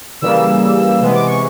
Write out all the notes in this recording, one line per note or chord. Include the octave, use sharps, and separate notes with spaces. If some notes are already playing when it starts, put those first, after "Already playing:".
C#3 E3 G3 A#3 E6
C3 E3 G#3 B3
D6
C#6